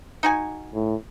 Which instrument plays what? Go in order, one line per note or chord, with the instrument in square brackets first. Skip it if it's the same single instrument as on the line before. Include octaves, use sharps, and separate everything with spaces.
[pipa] D#4 F#4 G#5
[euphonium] A2